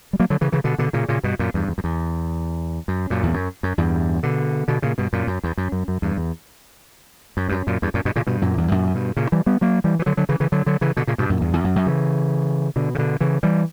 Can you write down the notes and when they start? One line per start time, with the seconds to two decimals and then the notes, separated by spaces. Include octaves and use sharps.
0.13 G3
0.20 F#3 A#3
0.30 D3 F#3
0.41 C#3 E3
0.52 C#3 E3
0.64 B2 D3
0.78 B2 D3
0.93 A#2 C#3
1.08 A#2 C#3
1.23 G2 B2
1.39 F#2 A#2
1.54 E2 G2
1.68 E2
1.78 F#2
1.84 E2
2.88 F#2
3.10 F#2 A#2
3.23 E2
3.34 F#2
3.63 F#2
3.78 E2 G2
4.23 B2 D3
4.68 B2 D3
4.82 A#2 C#3
4.98 G2 B2
5.13 F#2 A#2
5.27 F#2
5.43 E2
5.57 F#2
5.72 F#2
5.88 F#2
6.02 E2 G2
6.17 E2
7.37 F#2
7.49 G2
7.52 F#2
7.67 F#2 A#2
7.82 E2 G2
7.94 F#2 A#2
8.05 G2 B2
8.16 A#2 C#3
8.27 G2 B2
8.42 F#2 A#2
8.57 E2 G2
8.71 F#2 A#2
8.94 G2 B2
9.17 A#2 C#3
9.32 E3 G3
9.46 G3 B3
9.61 F#3 A#3
9.84 E3 G3
9.99 E3
10.06 D3 F#3
10.17 D3 F#3
10.29 C#3 E3
10.40 C#3 E3
10.52 D3 F#3
10.66 D3 F#3
10.81 C#3 E3
10.97 B2 D3
11.07 A#2 C#3
11.18 G2 B2
11.30 F#2 A#2
11.41 E2 G2
11.53 E2
11.64 F#2
11.76 F#2
11.86 C#3 E3
12.76 B2 D3
12.95 C#3
12.98 B2 D3
13.20 C#3 E3
13.43 E3 G3